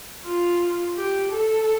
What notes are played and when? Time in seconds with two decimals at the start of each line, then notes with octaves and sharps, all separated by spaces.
0.24 F4
0.96 G4
1.32 A4